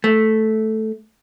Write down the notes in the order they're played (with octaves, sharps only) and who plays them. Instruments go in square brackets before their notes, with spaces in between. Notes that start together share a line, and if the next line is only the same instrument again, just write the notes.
[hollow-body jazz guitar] A3